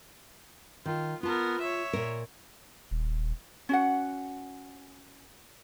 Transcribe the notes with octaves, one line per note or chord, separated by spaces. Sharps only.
D#3 F4
B3 F4 A#4 A5
C#5 E5
A#2 A#4
D#1
C#4 F#4 F#5